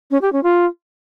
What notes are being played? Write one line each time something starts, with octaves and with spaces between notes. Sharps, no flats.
C#4
G4
C#4
F4